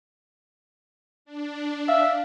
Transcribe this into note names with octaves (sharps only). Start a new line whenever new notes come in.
D4
E5 F5